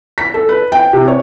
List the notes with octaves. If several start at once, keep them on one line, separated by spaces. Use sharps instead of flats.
B6
A4
B4
G5
C3
C#5